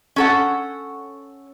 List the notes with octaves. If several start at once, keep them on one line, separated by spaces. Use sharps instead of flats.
C#4 A4 F#5